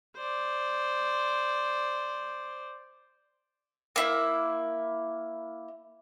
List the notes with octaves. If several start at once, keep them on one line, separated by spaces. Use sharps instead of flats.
C5 D5
A#3 E4